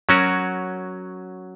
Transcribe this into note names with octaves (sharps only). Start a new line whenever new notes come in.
F#3 C#4 F#4 A#4